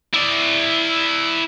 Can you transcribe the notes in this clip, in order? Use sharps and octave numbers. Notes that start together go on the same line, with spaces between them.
E4 D5